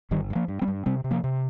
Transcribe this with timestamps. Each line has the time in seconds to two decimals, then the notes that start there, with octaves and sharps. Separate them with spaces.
0.11 G1 D#3 G3
0.30 G2
0.35 F3 A#3
0.48 G2
0.61 G3 C4
0.68 G2
0.86 C3 G3 C4
1.04 C3
1.11 F3 A#3
1.24 C3